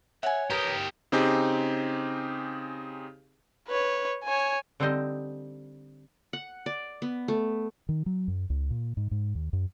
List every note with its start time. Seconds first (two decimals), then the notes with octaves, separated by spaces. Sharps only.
0.23 C#5 E5 F#5 G#5
0.50 G4 A#4 B4 A#5 D#6
1.12 C#3 C4 D#4 G4 G#4
3.68 B4 C#5
4.24 C#5 G#5
4.80 D3 G3 C4 D#4 C5 D#5
6.33 F#5
6.66 D5
7.02 B3
7.28 A3
7.89 D#3
8.06 F#3
8.28 F#2
8.50 C#2
8.70 A#2
8.97 G#2
9.11 G#2
9.35 D#2
9.53 F#2